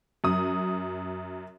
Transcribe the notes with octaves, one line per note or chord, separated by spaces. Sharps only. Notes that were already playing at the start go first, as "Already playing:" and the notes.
F#2 D#6